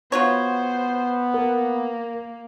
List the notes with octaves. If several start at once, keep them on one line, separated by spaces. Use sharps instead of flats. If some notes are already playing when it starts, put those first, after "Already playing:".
B3 F4 F#4 C5 C#5
A#3 A#4